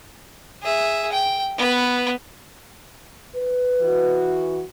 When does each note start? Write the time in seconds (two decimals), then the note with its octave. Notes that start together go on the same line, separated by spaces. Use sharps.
0.63 G#4 E5
1.12 G5
1.58 B3 B4
3.36 B4
3.81 E3 F#4